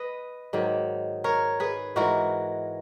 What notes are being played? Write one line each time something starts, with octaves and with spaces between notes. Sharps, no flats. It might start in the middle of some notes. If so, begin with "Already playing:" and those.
Already playing: B4 D#5
G#2 D#3 F#3
A#4 C#5
G#4 B4
G#2 E3 G#3 F#4 A#4